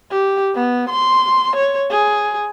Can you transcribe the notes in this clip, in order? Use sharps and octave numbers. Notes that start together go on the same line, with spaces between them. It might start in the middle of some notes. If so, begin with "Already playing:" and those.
G4
B3
C6
C#5
G#4